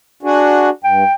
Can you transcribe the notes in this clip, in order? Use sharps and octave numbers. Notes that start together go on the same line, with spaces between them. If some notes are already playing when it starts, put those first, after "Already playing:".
D4 F#4 G#4
G2 G5